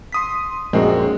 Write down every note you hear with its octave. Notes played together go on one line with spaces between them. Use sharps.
C6 D#6 B6
A#1 F#2 G#3 C4 F#4